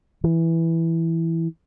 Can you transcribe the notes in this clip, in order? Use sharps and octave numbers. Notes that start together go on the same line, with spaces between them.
E3